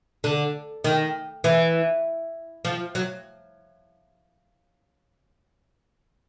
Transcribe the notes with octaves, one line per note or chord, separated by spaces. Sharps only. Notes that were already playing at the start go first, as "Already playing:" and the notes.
D3
D#3
E3
F3
F#3